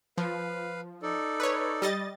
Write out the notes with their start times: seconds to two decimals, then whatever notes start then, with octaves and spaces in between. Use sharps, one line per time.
0.18 F3 B4 F5
1.02 D#4 A4 D5
1.40 B4 C#5
1.82 G3 D#5 A6